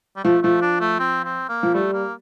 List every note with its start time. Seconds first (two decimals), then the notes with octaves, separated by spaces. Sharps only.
0.16 G3
0.24 F3 A3
0.42 F3 A3
0.62 D4
0.81 A3
0.99 C4
1.25 C4
1.49 A#3
1.63 F3
1.74 G3 A3
1.93 A#3